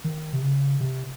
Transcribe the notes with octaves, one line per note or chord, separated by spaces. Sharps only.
D#3
C3
C#3
C3